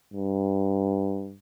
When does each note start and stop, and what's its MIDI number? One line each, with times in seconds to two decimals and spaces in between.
0.14 1.36 43